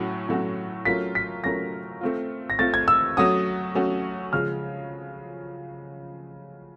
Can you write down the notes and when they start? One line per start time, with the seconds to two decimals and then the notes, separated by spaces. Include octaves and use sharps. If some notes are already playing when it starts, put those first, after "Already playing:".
Already playing: A2 F#3 A3 C#4 F#4
0.29 A2 F#3 A3 C#4 F#4
0.85 F#3 A3 C#4 F4 A#4 B6
1.15 B6
1.44 F#3 A3 C#4 F4 A#4 A#6
2.01 A3 C4 F4
2.50 A#6
2.59 A3 C4 F4 A6
2.74 G#6
2.88 E6
3.17 F#3 A3 C#4 F#4 D#6
3.75 F#3 A3 C#4 F#4
4.32 C#3 F3 G#3 F6